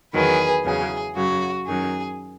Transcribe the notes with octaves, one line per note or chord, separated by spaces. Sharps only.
E2 D#3 F#3 G#4 B4
E2 C#3 F#3 G#4
F#2 C#3 F#3 F#4
F#2 D#3 F#3 G#4